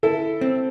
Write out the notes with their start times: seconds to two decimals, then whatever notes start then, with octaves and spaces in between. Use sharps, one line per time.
0.03 E4 A4
0.41 C4